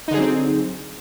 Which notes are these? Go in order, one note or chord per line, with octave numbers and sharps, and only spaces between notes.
D3 F#3 C4 D#4 G#4